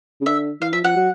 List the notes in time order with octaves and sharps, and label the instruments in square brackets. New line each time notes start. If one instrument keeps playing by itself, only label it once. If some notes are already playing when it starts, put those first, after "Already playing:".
[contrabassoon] C#3
[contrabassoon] D3 [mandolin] E5
[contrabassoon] E3 [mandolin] F5
[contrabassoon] F3 [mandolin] E5
[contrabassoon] F3 [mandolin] F#5
[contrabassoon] F#3